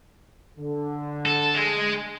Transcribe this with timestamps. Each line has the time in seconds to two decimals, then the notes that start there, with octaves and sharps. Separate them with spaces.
0.58 D3
1.26 A4
1.55 G#3